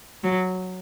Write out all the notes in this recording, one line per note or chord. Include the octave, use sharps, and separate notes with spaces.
F#3